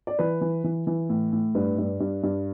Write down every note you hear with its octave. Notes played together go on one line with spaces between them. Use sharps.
D5
E3 B4
E3
E3
E3
A2
A2
G2 B4
G2
G2
G2